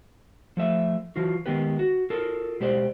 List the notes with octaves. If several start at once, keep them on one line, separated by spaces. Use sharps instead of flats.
F3 A3 E5
E3 F4 F#4
D#3 G#3 B3 G4 B4
F#4
F4 A4 A#4
B2 G#3 G4 C5 D5